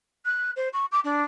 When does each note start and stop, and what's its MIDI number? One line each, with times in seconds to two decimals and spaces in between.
0.25 0.51 90
0.56 0.68 72
0.73 0.85 85
0.92 1.00 86
1.04 1.23 62